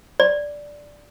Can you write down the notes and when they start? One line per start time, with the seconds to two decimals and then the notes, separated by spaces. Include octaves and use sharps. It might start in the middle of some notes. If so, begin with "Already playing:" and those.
0.20 D5